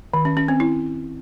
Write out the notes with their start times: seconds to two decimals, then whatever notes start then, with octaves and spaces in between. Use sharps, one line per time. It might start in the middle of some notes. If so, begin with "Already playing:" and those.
0.14 D#3
0.25 C#4
0.37 C#4
0.48 C4
0.60 E4